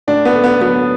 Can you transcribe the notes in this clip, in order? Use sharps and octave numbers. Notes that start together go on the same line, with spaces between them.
A2 D4
B3
A3
B3
F#3 B3